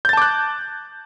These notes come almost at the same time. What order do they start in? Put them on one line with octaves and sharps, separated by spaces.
G6 A6 A5 D6 F#6